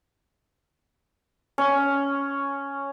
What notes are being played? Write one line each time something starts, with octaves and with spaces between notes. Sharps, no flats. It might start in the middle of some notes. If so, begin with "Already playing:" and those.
C#4